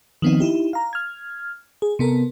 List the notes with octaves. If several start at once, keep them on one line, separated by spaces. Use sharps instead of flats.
D#3 F3 B3 C4 D#4
D#4 E4 G4
F5 A#5
F6 G#6
G#4
C3 B3 A4 A#4